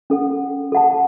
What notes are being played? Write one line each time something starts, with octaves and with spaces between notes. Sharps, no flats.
C#4 A4 F#5
A4 F#5 A5